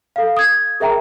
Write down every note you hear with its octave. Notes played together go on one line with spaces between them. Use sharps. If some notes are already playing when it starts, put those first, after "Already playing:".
A4 F5
D#6 G#6
G#4 A#4 E5 G5 A#5